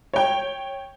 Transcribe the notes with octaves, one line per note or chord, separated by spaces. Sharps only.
C#5 G5